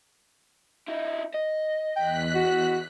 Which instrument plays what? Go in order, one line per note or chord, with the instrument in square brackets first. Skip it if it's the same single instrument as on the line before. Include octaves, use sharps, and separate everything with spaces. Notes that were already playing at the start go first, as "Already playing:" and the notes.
[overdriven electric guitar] D#4 E4
D#5
[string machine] E2 F#6 B6 [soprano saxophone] G5
[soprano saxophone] F#4